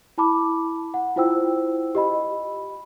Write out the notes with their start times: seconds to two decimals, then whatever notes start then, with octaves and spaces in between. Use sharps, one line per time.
0.18 E4 A5 B5 D6
0.94 F#5
1.16 E4 F4 C5 G5 E6
1.95 G4 D#5 B5